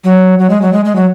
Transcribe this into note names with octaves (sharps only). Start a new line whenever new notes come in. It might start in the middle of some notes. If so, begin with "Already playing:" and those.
F#3
F#3
G#3
F#3
G#3
G#3
F#3